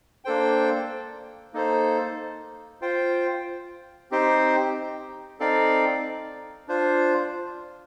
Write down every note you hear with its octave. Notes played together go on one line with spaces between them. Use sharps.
A#3 D4 A4 C5 G5
A#3 D#4 A4 C5
F4 C5 G5
C4 D#4 G4 C5 G5
C4 D#4 A4 D5 F5
D4 F4 C5